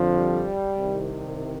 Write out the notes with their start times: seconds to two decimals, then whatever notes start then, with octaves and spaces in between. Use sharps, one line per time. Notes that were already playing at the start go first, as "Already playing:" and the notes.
Already playing: F2 D3 F3
0.13 G3
0.76 C2 C3 D#3